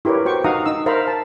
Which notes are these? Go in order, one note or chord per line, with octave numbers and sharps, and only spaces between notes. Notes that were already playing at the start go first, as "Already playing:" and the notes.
E4 G4 A#4 B4 C#5
F#4 C5 G5 C#6
D#4 F#4 F5 F#5 A#5 D#6
D#4 E6
A#4 C5 E5 F5 A#5 B5
A5